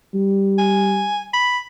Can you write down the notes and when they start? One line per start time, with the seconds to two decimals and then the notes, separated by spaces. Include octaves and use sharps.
0.14 G3
0.58 G#5
1.33 B5